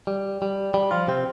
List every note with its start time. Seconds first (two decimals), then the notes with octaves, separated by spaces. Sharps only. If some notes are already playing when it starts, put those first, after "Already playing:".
0.07 G3
0.42 G3
0.74 G3
0.91 F3 F4
1.08 C3 C4